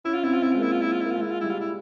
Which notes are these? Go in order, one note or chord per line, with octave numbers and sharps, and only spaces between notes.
C#4 E4
F4
C4 E4
F4
C4 E4
G#3 F4
A#3 E4
F4
E4
F4
A#3 E4
G#3 F4
E4
F4
G3 E4
F4
E4